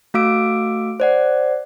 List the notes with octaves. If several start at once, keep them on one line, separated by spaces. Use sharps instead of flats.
A3 F#4 F5 D6 E6 D7
C5 D5 F#5